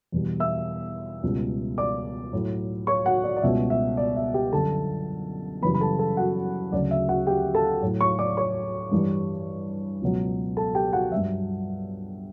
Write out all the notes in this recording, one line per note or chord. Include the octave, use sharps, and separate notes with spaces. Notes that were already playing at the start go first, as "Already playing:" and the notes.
E2 B2 G3
E5 E6
C#2 B2 G3
D5 D6
A2 F#3
C#5 C#6
F#4 F#5
D5
D5
C#2 B2 G3 E5
E5
D5
E5
G4 G5
F#2 D3 G3 A4 A5
F#2 C#3 E3 G3 B4 B5
B5
A4 A5
A4 A5
F#4 F#5
D2 C#3 F#3 D5
E5
F#4 F#5
G4 G5
A4 A5
A2 F#3
C#5 C#6
D5 D6
C#5 C#6
G2 E3 G3
C#2 B2 F#3
A4 A5
G4 G5
F#4 F#5
G2 F#3 E5